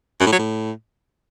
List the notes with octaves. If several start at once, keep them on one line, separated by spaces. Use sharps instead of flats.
F#2
A2
F#3
A2